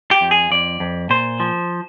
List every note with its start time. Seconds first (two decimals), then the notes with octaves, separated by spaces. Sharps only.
0.11 G4
0.21 F2
0.31 G#4
0.51 F2 D5
0.80 F2
1.10 A#2 C5
1.40 F3